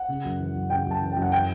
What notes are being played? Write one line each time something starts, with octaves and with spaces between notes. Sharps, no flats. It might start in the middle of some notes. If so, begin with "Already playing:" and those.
Already playing: F#5
C#3
F#2
E3
F#2
C#3 G5
F#2
A5
E3
F#2 G5
F#5
E3 G5